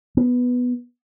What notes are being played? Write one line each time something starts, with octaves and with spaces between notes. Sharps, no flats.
B3